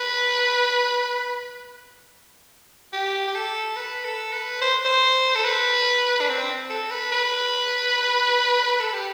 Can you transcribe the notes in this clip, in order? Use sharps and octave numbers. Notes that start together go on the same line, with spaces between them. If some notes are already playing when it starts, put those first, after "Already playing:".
Already playing: B4
G4
G4
A4
B4
A4
B4
C5
C5
A4
B4
D4
C4
A4
B4
B4
A4
G4